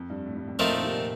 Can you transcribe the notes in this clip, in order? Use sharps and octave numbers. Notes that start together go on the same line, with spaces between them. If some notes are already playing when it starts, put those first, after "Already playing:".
Already playing: F2
G2
A2
G2
F2
F2 F3 A3 C4 D#4 A#4
A#2
D#3
C3
A#2